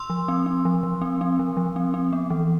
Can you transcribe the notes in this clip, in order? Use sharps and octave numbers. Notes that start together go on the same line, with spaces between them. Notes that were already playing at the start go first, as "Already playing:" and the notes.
Already playing: C6 E6
F3
C4
C4
F3
F3
C4
C4
F3
F3
C4
C4
B3
E3